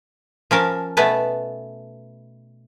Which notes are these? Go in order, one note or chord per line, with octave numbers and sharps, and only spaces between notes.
F3 C#4 A#4 A5
B2 A3 B3 B4 G#5 A5